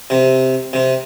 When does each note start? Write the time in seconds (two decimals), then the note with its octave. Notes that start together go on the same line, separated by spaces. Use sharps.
0.10 C3
0.73 C3